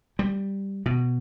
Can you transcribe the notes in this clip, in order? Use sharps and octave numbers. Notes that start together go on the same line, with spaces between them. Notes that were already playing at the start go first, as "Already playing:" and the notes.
G3
B2